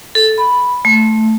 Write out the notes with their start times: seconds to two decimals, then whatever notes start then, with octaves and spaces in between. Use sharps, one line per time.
0.15 A4
0.38 B5
0.85 A3